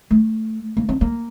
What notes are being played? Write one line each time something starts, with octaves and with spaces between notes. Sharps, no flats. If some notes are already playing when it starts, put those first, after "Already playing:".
A3
A#3
C4
A#3